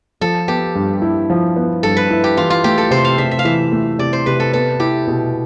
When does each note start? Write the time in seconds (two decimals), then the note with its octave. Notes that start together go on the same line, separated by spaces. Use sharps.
0.21 F3 A4
0.48 B3 G4
0.75 G2
1.02 E4
1.30 F3
1.56 B3
1.83 G2 A4
1.97 B4
2.10 E4
2.24 G4
2.37 E3 F4
2.50 F4
2.64 A3 G4
2.78 A4
2.91 C3 C5
3.04 F5
3.18 C3 E5
3.31 E5
3.39 F5
3.45 E3 E5
3.72 A3
3.99 C3 D5
4.13 C5
4.26 C3 B4
4.40 A4
4.53 B3 A4
4.80 E4 G4
5.07 B2